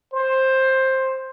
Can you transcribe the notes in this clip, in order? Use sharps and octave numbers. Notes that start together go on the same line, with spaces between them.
C5